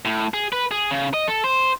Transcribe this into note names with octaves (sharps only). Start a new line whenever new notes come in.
A2
G#4
B4
G#4
C#3
D#5
A4
C5